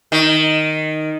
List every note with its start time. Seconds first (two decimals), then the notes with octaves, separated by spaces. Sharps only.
0.12 D#3